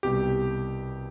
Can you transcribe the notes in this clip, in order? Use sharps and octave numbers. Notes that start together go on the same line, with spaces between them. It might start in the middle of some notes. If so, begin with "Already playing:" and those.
C2 B2 G3 G4